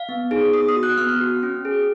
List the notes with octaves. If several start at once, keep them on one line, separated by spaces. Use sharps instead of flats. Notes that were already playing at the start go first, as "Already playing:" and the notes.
Already playing: F5
B3
D#4 G#4
B3 D#6
D#6
F#4
F#6
B3 F6
F#4
C#4
G#4